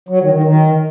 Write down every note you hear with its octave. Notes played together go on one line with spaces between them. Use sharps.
F#3
D#3
D#3
D#3